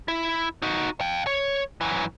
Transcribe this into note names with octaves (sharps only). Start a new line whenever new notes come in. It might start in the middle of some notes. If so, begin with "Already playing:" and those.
E4
D#4 F#4
F5 G5
C#5
F#2 E3